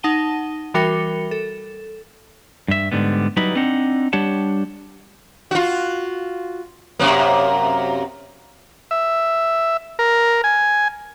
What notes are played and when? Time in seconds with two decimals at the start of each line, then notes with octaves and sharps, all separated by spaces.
0.03 D#4 F#5 A5 D#7 G7
0.74 E3 G3 F#4 A#4 C#7 G7
1.31 A4
2.68 G2 E5
2.91 G#2 D3 G3 B3
3.37 F#3 G3 D#4 E4 B4
3.56 C4 D4 D#4 F#5
4.13 G3 D4 G4 C#5 F#5 A5
5.51 F4 F#4
6.99 F#2 C3 A#3
8.91 E5
9.99 A#4
10.44 G#5